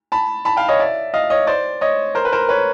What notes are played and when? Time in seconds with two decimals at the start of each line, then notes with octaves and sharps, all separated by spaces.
0.12 A5 B5
0.45 A5 B5
0.57 F5 G5
0.68 C#5 D#5
0.80 D5 E5
1.14 D#5 F5
1.30 C#5 D#5
1.47 C5 D5
1.81 C#5 D#5
2.15 A#4 C5
2.25 B4
2.32 A#4 C5
2.49 B4 C#5